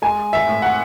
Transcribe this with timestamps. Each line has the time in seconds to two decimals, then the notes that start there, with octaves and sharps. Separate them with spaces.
0.02 G#3 G#5
0.33 E5
0.47 A2
0.62 F#5